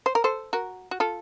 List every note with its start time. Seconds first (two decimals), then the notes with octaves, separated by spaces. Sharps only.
0.06 C5
0.15 A#4
0.24 A4 C5
0.53 F#4 A#4
0.91 F#4
1.00 F4 A4